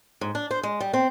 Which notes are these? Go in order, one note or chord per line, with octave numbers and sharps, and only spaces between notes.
G#2
D4
C5
G#3
G3
C4